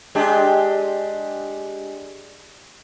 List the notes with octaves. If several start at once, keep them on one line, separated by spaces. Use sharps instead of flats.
G#3 D4 G4